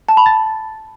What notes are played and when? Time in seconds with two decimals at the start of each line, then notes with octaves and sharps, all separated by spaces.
0.09 A5
0.17 B5
0.26 A6